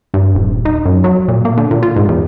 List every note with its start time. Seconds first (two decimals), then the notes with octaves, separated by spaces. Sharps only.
0.14 G2
0.35 D#1
0.65 D#4
0.85 F#2
1.04 F#3
1.28 A#2
1.45 A#3
1.57 D3
1.71 A#2
1.82 F4
1.96 G#2
2.08 E2